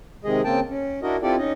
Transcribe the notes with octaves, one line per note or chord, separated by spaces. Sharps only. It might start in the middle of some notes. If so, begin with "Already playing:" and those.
C3 D#3 G#3 G#4 D#5
C#3 A#3 C4 G5 A5
C#4
D4 E4 F#4 A#4 D#5
C4 E4 F4 G4 A4 D5
C#4 D#4 D#5